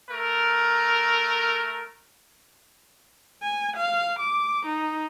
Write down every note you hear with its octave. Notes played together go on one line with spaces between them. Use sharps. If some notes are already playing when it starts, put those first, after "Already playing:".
A3 A#4
G#5
F5
D6
D#4